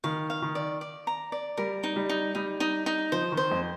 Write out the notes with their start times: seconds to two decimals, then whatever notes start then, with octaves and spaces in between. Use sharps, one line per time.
0.04 D#3 F5
0.30 F5
0.42 D#3
0.55 D5
0.81 D5
1.07 A#5
1.32 D5
1.57 G3 A#4
1.84 D#4
1.96 G3
2.09 D#4
2.35 G3 D#4
2.60 D#4
2.86 D#4
3.12 F3 C5
3.32 D#3
3.37 C5
3.51 F2